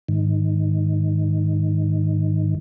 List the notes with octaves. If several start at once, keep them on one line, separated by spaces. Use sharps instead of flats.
G#2 D#3